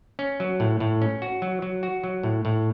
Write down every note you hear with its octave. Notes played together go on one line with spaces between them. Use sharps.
C#4
F#3
A2
A2
C#4
F#4
F#3
F#3
F#4
F#3
A2
A2